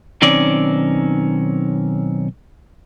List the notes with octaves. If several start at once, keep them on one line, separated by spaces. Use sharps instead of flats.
B1 D#3 C4 C#4 D5